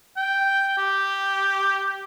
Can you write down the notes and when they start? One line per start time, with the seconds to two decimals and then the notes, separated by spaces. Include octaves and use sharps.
0.17 G5
0.78 G4